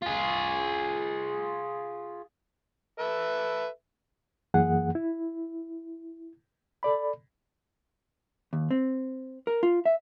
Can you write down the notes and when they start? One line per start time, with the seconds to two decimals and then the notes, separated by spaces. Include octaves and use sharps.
0.02 F4 G#4
2.99 A4 B4 E5
4.54 F#2 E3 A#3 G#4 F#5
4.95 E4
6.83 A4 D5 B5
8.53 D#2
8.71 C4
9.47 A#4
9.63 F4
9.86 E5